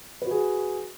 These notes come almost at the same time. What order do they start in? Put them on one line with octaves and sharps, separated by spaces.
B4 F#4 G#4